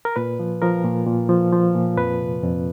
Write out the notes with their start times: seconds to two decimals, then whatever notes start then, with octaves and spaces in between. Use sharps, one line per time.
0.05 A#4
0.16 A#2 B4
0.39 F3
0.62 F3 A#4
0.84 A#2
1.07 A#2
1.29 F3
1.52 F3
1.76 A#2
1.97 F2 B4
2.20 C3
2.43 F2